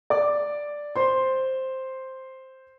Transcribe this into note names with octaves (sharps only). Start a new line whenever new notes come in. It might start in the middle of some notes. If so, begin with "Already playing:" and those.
D5 D6
C5 C6